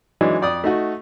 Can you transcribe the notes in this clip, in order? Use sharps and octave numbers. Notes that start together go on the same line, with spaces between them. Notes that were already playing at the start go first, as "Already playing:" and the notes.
E3 F#3 G#3 D4 D#4
F2 D5 D#6
A3 D#4 F#4